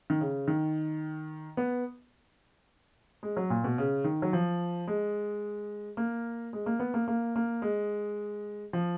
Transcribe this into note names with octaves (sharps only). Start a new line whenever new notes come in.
D#3
C#3
D#3
B3
G#3
F#3
A#2
B2
C#3
D#3
F#3
F3
G#3
A#3
G#3
A#3
B3
A#3
A#3
A#3
G#3
F3